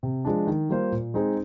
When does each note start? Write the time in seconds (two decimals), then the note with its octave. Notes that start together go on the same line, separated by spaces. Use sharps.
0.03 C3
0.25 F3 G#3 D4
0.47 D#3
0.70 G3 A#3 F4 C5
0.92 A#2
1.14 G#3 C4 D#4 G#4